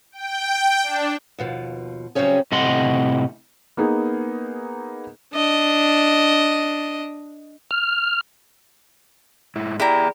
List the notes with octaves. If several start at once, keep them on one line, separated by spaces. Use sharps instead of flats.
G5
D4
D#2 B2 F3
C#3 F#3 G3 C4 C#4 G#4
A2 C3 D#5 F#5 C6
A#3 B3 D#4 G#4
D4 D#5
F6
G#2 E4
E4 G4 G#4 D5 A#5